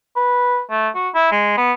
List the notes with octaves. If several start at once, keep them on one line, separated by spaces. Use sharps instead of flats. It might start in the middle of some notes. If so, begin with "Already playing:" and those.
B4
A3
F#4
E4
G#3
B3